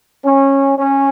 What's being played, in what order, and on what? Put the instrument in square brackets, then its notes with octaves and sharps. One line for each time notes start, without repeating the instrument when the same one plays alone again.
[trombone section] C#4
C#4